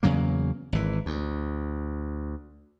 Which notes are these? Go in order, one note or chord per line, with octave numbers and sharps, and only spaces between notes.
E2 C#3 F#3 A#3
G#1 E3
D2